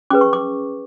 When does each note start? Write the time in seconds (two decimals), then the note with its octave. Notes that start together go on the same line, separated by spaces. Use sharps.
0.10 C#4 G#4 B4 D6
0.21 C#6
0.33 D6